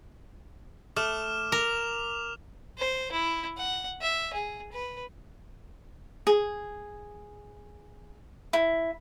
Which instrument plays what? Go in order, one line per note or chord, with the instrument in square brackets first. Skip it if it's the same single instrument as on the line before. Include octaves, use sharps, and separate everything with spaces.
[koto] A3 [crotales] D6 F6 E7
[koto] A#4 [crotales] D6 F7
[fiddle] C5
E4
F#5
E5
G#4
B4
[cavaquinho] G#4
E4